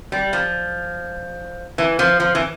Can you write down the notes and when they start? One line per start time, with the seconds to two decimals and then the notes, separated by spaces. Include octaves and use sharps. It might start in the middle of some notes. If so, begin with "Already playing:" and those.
0.12 G3
0.33 F3
1.78 E3
1.99 F3
2.20 F3
2.35 E3